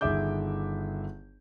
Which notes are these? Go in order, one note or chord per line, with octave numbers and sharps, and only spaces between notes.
G1 D#3 G#4 E5 D6 G6